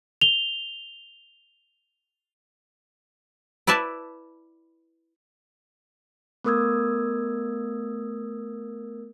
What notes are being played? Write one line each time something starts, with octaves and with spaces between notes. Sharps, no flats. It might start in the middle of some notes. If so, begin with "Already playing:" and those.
F7 G7
E4 B4 D5 E5 A5
A3 B3 A#4 D#6 E6 G#6